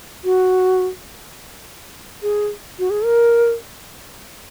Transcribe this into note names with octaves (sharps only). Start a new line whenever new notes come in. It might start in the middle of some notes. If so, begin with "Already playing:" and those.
F#4
G#4
F#4
G#4
A#4